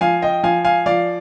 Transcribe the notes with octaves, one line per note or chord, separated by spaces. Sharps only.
F3 F5 G#5
D#5 G5
F3 F5 G#5
F5 G#5
F3 D5 F5